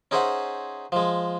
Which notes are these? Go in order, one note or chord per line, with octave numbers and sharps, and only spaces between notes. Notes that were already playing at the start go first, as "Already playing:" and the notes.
C#4 D#4 G#4 C5 E5 F#5
F3 G#3